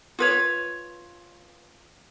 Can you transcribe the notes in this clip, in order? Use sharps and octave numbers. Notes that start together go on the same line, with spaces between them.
F4 B4 C#5